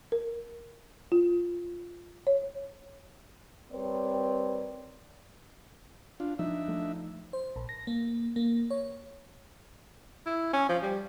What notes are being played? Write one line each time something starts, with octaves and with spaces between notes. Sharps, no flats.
A#4
F4
C#5
G3 C4 A#4 B4 C#5 D5
D4 F4
F3 D4 D#4 E5
F3 A3
C5
A#1
A#6
A#3
A#3
C#5
E4
C#4
F3
G3